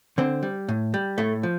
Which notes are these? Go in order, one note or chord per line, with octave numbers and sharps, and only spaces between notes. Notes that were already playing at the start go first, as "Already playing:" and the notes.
D3 C4
G3
A2
G3
A2 A3
F3